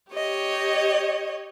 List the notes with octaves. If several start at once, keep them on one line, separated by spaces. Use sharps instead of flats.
G4 C#5 D#5